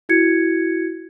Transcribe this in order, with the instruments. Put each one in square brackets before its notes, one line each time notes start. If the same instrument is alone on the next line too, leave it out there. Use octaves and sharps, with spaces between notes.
[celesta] E4 F#4 G#6 C#7